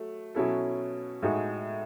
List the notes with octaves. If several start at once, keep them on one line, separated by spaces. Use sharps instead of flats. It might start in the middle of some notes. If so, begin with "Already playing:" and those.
Already playing: F#3 A3
B2 F#3 C#4 E4 A4
A2 G#3 D#4 F#4